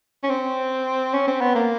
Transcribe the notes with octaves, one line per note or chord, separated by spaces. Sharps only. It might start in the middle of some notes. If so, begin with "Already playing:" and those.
C#4
C4
C#4
C4
B3
A#3